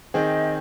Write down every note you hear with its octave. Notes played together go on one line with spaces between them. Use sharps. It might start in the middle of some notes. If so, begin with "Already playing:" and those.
D#3 C4 G#4 D#5